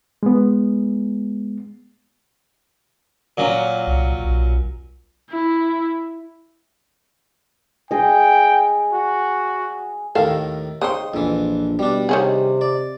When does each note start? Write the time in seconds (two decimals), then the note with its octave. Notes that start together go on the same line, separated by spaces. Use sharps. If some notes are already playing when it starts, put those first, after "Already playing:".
0.23 G#3 B3
3.37 A#2 F#3 C#4
3.87 C2
4.24 B1
5.31 E4
7.91 G#4 D#5 G5
8.92 F#4
10.15 D#2 A2 D#3 A4 F5
10.82 C#3 C4 D#4 C6 D#6
11.14 A#1 F2 E3
11.79 B2 G3 D4
12.09 C3 D#3 C#4 G#4
12.61 D5